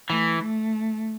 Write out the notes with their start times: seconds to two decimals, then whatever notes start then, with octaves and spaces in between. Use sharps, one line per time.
0.09 E3 A3
0.41 A3